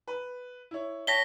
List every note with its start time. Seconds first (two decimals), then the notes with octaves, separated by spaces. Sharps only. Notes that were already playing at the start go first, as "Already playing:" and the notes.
0.08 B4
0.71 E4 C#5
1.07 C#5 G5 A5 A#6 B6 G7